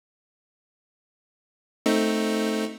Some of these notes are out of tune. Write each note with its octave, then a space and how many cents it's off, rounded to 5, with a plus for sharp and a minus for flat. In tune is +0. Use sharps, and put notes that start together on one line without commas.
A3 +0 C4 +0 D#4 +0